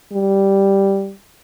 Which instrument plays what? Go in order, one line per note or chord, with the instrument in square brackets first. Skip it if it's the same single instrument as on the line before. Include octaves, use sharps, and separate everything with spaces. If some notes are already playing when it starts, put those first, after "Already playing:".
[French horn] G3